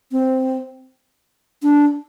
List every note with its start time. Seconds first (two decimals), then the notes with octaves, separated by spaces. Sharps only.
0.12 C4
1.63 D4